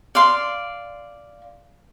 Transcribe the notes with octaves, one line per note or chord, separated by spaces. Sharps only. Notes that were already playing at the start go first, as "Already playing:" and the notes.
D5 F5 C6